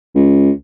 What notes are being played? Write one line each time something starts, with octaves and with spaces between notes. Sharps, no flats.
C#2